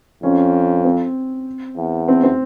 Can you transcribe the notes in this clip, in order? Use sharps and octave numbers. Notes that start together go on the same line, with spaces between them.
F2 C#4
C4
E2
C4
C4